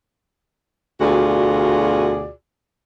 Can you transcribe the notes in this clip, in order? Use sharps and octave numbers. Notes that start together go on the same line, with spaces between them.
D2 B2 F4 F#4 G#4 D5